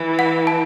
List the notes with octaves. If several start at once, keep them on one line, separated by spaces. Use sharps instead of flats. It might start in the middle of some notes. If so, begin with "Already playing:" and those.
Already playing: E3
F#5
A5